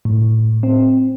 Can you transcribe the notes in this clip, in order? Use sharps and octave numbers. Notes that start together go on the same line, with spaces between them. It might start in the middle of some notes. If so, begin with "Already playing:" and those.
A2
C4